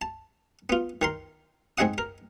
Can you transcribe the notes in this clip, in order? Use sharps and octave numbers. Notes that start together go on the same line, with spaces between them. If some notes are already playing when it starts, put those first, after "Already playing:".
A5
B3 F4
D#3 A#4 C6
G#2 C4 G#4 D#5 F#5 D#6
A#4